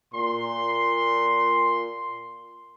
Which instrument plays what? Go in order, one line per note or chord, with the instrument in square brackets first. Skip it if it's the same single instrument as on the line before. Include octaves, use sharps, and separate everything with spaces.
[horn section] A#2 C6